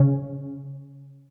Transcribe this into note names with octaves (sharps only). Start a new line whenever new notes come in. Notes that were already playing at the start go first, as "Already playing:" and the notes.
Already playing: C#3 C#4